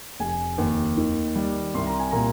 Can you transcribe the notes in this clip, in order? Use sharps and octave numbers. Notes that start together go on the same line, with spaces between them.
F1 G#5
D#2
D#3
G3
C2 C6
A#5
G#5
A#2 A#5